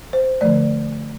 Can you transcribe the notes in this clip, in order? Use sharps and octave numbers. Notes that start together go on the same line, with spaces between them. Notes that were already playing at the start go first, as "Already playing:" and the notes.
C5
D3 F3 A3 D5